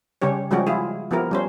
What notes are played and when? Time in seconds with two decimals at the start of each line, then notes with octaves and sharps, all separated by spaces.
0.22 C#3 G3 C#4 G4 C#5
0.51 F3 G3 G#3 C#4 F#4 G4
0.67 E4 F4 G#4
1.11 F3 B3 E4 G4 A#4
1.31 G3 C#4 C5